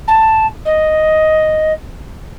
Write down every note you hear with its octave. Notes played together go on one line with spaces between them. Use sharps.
A5
D#5